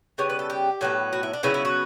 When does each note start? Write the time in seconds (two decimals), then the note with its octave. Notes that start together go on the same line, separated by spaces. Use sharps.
0.18 C#3 G3 B3 C#5
0.30 B4
0.39 A4
0.50 G4
0.81 A2 F#3 B3
1.13 F#4
1.23 E4
1.33 D4
1.43 C#3 F#3 B3 E4
1.54 E4
1.65 F#4